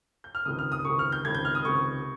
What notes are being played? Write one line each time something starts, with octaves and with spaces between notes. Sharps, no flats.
G6
F6
C#2 C3 D#3 D#6
F6
D#6
C#2 C3 D#3 C#6
F6
G6
C#2 C3 D#3 G#6
G6
F6
D#6
C#2 C3 D#3 C#6